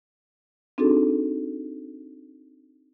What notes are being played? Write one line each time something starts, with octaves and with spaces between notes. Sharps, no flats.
C4 D4 D#4 F#4 G#4 A4